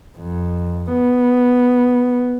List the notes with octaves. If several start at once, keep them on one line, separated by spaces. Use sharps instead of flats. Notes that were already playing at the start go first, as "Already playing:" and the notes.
F2
B3